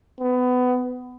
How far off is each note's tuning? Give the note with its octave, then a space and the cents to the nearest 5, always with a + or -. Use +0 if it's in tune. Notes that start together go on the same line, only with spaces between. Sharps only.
B3 +20